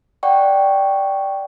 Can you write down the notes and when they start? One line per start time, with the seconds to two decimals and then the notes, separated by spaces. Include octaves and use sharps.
0.23 D5 F#5 G5 C#6